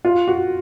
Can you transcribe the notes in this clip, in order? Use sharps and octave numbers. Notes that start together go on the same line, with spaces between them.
F4
F#4